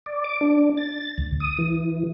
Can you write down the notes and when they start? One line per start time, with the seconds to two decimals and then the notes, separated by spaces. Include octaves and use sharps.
0.06 D5
0.24 D6
0.41 D4
0.77 A6
1.18 D2
1.40 D#6
1.58 E3